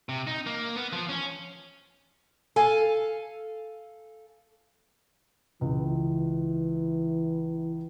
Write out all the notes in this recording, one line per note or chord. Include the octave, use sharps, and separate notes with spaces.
C3
D#4
A#3
B3
F3
C#4
A4 F5 G#5
C#2 E3